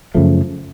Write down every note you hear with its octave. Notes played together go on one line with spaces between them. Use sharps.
F#2 C#3 F3 A3